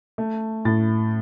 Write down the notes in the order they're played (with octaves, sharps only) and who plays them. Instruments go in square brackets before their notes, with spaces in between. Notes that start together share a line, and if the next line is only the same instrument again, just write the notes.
[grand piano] A3
A2 A6